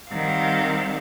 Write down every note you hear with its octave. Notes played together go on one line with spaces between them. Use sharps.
D#3 G3 C4 F5 F#5